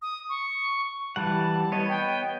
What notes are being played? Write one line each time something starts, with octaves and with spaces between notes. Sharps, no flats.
D#6
C#6
E3 G3 F#5 A5
B3 C#5 D#5
G5